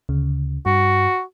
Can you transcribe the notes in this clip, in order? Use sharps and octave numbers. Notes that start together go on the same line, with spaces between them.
D2 C#3
G2 F#4